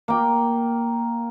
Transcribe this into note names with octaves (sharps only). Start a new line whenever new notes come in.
A#3 G5